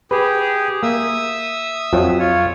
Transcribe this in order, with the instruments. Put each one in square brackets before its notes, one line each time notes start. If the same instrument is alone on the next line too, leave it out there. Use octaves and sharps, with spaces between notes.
[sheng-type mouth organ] G4 G#4 [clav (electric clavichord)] B4
[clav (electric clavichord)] A#3 [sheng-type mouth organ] E5 D#6 E6
[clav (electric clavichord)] F2 F3 F#3
[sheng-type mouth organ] F4 C#5